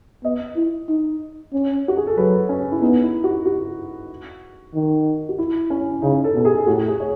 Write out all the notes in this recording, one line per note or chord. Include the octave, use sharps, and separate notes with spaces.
B3 D#5
E4
D#4
C#4
F#4
G#4
A4
F#3 B4
C#4
E4
B3 D#4
E4
F#4
F#4
D#3
F#4
E4
C#4
C#3 D#4
A4
B2
G#4
A2 F#4
G#4
C#5